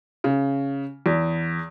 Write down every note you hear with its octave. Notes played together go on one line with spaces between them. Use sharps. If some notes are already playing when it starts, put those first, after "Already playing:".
C#3
E2